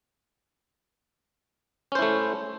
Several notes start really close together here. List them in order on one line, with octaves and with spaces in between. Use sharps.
C#4 C5 E4 A3